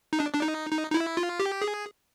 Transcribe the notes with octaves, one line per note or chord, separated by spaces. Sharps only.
D#4
D4
D4
D#4
D#4
D#4
E4
F4
G4
G#4